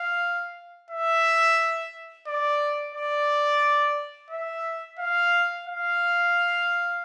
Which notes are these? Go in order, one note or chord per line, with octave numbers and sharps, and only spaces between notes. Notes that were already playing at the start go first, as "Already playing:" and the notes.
Already playing: F5
E5
D5
D5
E5
F5
F5